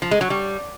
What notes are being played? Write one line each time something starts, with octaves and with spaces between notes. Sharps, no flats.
F3
G#3
F#3
G3